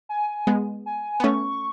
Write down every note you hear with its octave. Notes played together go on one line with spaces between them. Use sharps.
G#5
G#3 B3
G#5
B3
A3 C#4 C#6